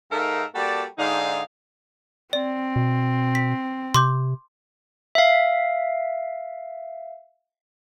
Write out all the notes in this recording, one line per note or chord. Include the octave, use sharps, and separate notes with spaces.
G#2 D#4 A4 A#4 E5 F5
G3 A#3 F#4 A4 D5 A5
G#2 D3 D4 D#4 G#4 F5
C4 D5
B2
B6
C3 C6 D6 G6
E5 F5